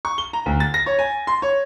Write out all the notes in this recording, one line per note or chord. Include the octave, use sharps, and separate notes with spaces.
C#6
G7
A#5
D2
A6
A#6
C#5
G#5
C6
C#5